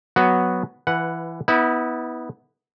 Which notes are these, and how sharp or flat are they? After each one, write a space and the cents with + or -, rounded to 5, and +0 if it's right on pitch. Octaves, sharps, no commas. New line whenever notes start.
F#3 +0 B3 +0 F#4 +0
E3 +15 B4 +0 F#5 +0
B3 +0 E4 -30